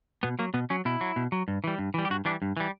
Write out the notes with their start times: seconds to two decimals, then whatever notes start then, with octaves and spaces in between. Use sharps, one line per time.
0.23 B2 B3
0.39 F#3 A#3
0.54 B2 B3
0.70 F#3 C#4
0.85 B2 E4
1.01 F#3
1.16 B2
1.32 F#3
1.48 G2
1.64 E3 G3
1.79 G2
1.94 E3 G3
2.05 G4
2.10 G2 F#4
2.25 E3 G3 D4
2.42 G2
2.57 E3 G3